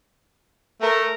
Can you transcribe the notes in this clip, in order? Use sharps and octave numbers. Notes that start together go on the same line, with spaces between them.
A3 A#4